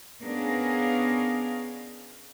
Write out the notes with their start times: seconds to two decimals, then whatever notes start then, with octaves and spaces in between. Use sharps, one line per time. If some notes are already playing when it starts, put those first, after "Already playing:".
0.20 B3 C#4 D4 G#4 A#4 F5